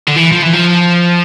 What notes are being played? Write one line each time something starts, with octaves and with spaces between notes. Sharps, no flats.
D3
E3
F3
E3
F3